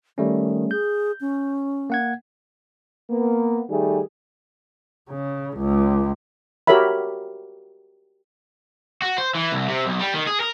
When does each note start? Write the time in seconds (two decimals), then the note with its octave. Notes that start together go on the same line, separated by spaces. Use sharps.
0.18 D#3 G3 A3 C#4
0.71 G#4 G6
1.21 C#4
1.90 A#3 F#5 G#6
3.10 A#3 B3
3.69 D#3 G3 A3 G#4
5.10 C#3
5.57 C#2
6.67 F#4 G4 A#4 C#5 E5 B5
9.02 F#4
9.18 C5
9.35 E3
9.52 C2
9.68 C3
9.85 B1
9.99 G3
10.14 D#3
10.27 G#4
10.40 A#4